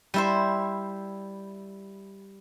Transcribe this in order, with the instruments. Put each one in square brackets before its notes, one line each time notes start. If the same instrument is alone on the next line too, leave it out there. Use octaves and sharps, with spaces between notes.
[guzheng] G3 E4 C5